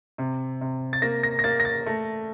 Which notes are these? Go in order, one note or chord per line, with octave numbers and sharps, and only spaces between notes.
C3
C3
A6
A#3 A#6
A#6
A#6
A#3 A6
A#6
A6
A3